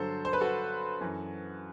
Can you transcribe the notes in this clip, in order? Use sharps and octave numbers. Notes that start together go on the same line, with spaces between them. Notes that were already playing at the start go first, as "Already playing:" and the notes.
Already playing: G2 D3 F#3 A4 C5
C5
B4
F#4 A4
F#2 E3